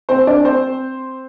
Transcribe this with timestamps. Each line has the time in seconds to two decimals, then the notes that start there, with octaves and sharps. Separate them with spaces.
0.09 C4 C5
0.27 D4 D5
0.44 C4 C5